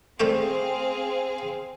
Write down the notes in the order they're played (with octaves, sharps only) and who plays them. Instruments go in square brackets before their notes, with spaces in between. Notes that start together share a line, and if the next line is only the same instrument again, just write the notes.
[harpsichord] G3 A3 G4 [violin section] C4 G#4 F5